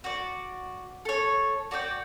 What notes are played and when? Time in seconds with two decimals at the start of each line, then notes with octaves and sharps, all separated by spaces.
0.04 F#4 D5
1.05 A4 C#5
1.71 F#4 D5 E5 G5